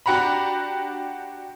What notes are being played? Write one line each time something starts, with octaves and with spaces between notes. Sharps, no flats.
D4 F#4 G4 F#5 A#5 B5